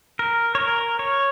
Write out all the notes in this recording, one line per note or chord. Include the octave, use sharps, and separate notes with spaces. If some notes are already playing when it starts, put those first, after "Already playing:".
A#4
C#5
A#4
C#5